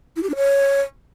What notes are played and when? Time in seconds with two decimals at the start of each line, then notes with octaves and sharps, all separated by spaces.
0.16 E4
0.23 G4
0.29 D4
0.36 C#5